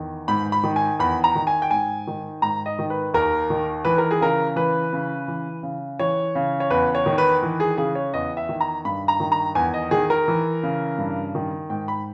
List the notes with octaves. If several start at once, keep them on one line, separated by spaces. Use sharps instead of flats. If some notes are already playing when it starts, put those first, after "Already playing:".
Already playing: E2 D#3
G#2 B5
B5
D#3
G#5
E2 B5
A#5
D#3
G#5
G5
G#2 G#5
D#3
G#2 A#5
D#5
D#3
B4
D#2 A#4
D#3
E3 B4
A#4
G#4
C#3 A#4
E3 B4
C#3
E3
C#3
E3 C#5
C#3
C#5
E2 B4
C#5
D#3
B4
E3
G#4
C#3 G#4
C#5
E2 D#5
E5
D#3
A#5
G2 B5
A#5
D#3
A#5
E2 G#5
D#5
D#3 G#4
A#4
E3
C#3
G2
D#3
G#2 G5
B5